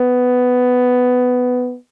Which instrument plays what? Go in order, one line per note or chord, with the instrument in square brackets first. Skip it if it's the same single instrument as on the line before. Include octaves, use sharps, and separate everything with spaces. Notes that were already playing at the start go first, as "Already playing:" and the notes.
Already playing: [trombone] B3